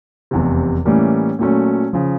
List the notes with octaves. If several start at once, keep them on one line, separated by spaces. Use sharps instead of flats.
F1 E2 C3
A2 E3 G3 A#3 C#4
A#2 F#3 A3 C#4
C#3 F3